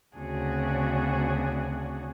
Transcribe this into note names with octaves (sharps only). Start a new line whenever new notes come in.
D2 C#3 C4 D4 F#4 G#4